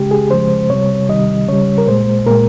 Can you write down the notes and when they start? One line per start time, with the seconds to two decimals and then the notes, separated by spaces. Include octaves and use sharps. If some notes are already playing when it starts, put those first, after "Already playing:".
Already playing: C#3 G#3 G4
0.11 G#4
0.31 C#3 F3 G#3 C5
0.70 C3 G3 C#5
1.09 C3 D#3 G3 D#5
1.48 C#3 G3 C#5
1.78 A#4
1.88 A#2 G#3 C5
2.27 A#2 G#3 A#4